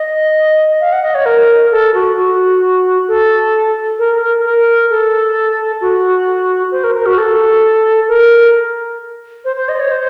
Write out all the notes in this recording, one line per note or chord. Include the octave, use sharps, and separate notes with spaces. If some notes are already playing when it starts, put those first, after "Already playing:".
Already playing: D#5
F5
F#5
D#5
C#5
A#4
A4
F#4
F#4
A4
A#4
A#4
A#4
A4
F#4
C5
A#4
A#4
F#4
A4
A#4
C5
C5
D#5
C#5
C5